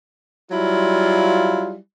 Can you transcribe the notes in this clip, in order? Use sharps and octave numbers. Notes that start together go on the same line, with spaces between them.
F#3 G3 E4 F4